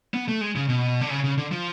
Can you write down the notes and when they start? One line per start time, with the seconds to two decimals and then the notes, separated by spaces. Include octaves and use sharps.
0.14 B3
0.28 A3
0.41 G#3
0.56 C#3
0.69 B2
1.01 D3
1.10 C#3
1.24 C#3
1.38 D3
1.51 F3